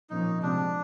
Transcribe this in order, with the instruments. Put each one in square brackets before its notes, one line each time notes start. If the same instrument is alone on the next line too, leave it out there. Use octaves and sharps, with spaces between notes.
[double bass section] A#2 F3 A#3 C#4 [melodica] D#4
[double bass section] C3 F3 G#3 C4 [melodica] D4